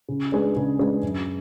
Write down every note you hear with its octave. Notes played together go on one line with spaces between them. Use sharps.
C#3
G#3 D4 G#4 B4
C#3
G#3 D4 G#4 B4
F#2